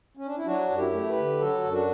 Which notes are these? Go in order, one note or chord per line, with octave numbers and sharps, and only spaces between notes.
C#4
D4
E4
F#3 D4 F#4
F#2
E4 G4
A3
G4 B4
D3
F#3 F#4 A4
F#2
D4 F#4